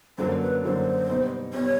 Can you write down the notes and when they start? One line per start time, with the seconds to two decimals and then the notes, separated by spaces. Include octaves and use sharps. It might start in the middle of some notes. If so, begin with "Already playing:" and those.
0.18 F#2 D3 F#3 A#3 C5
0.41 B4
0.63 F#2 D3 F#3 A#3 C5
1.09 B2 G3 B3 D#4
1.54 B2 G3 B3 D#4 C#5